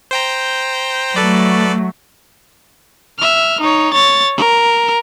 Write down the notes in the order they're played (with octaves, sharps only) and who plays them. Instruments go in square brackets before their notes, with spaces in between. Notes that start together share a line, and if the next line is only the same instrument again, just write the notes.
[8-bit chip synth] C5 G5 A#5
[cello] F#3 A3 [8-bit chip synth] A4 B4 D5
[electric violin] E5 F6
D#4 C#5
C#5 A6
A#4